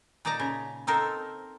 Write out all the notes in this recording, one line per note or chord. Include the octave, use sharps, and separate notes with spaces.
A#2 D#4 D5 A5 A#5
C#3
C4 D#4 A4 A#4 C5